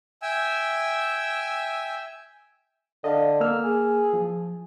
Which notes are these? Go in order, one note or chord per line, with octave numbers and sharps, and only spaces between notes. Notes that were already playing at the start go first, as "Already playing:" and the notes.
E5 G5 G#5 E6
D3 D#5 F5
A#3 E6 F6
G#4
F3